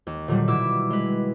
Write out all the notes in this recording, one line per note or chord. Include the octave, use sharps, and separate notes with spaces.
D#2
A#2 D3 D#3 F#3 G3
B2 E4 D6 E6
G#3 B4